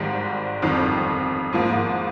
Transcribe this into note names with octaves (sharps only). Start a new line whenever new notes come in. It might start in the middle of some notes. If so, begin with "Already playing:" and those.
Already playing: G#1 G#2 D#3 G3
G1 F2 D#3
G#2 F3 A#3